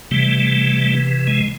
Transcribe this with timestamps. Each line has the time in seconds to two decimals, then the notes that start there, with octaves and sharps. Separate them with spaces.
0.11 C3 E3 G3 A3
1.27 G#3